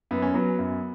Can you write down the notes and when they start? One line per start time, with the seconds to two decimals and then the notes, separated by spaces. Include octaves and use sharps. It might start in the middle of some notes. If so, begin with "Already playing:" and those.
0.11 F#2 B3
0.22 C#4
0.34 F#3 B3
0.59 F#2